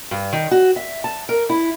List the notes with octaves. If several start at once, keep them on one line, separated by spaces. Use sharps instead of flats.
G2
D#3
F#4
E5
A5
A#4
E4